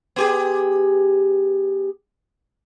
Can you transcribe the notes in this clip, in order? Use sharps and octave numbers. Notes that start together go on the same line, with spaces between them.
B3 G4 G#4